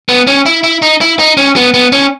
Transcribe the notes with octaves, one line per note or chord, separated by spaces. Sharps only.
B3
C#4
E4
E4
D#4
E4
D#4
C#4
B3
B3
C#4